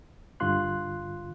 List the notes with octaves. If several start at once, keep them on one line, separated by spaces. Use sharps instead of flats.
G2 D3 F4 C6 F#6